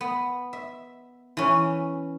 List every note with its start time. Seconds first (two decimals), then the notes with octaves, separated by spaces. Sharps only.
0.01 B3
0.53 E5
1.37 E3 C#4